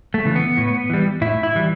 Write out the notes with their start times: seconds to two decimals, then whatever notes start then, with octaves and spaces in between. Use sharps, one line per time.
0.14 A3
0.25 C#3 E3
0.35 B3
0.57 A2
0.90 E3 G3
1.21 A2 E4
1.43 E4
1.55 E3 G3